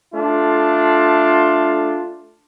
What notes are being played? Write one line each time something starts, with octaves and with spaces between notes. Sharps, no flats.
A3 D4 F4